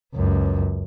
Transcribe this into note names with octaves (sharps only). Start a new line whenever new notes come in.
C#2 F#2